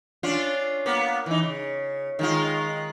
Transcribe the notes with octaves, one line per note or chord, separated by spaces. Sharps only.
C#4 D4 F4
A#3 B3
E3 D#4
C#3
D#3 G#3 F4